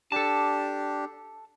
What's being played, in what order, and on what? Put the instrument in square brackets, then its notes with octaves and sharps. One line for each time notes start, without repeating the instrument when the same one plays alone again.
[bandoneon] D4 G4 [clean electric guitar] A4 A5